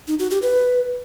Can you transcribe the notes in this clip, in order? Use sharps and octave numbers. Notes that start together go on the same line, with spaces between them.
D#4
F#4
G4
B4